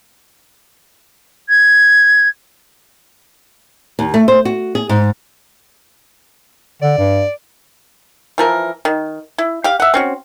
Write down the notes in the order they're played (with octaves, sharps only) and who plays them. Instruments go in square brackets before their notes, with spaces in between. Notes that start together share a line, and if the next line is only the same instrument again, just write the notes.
[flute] G#6
[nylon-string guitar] D#2
A3
C5
F#4
G#4
G#2
[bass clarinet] D3 [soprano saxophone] D5
[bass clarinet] G2
[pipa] E3 F3 A#4
D#3
E4
G4 F5
E5 F#5
C4 C#4 F#4